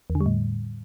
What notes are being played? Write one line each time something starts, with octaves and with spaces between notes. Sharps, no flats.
E2
D3
G3
A2